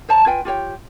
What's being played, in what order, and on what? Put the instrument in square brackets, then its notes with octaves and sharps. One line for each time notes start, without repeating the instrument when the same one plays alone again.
[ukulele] C5 C#5 A5 A#5
F4 B4 G5 G#5
F4 G4 C#5 G5